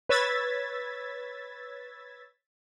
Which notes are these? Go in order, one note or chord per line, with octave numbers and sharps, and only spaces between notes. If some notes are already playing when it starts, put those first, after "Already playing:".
B4 C#5 E6 G#6 A6 B6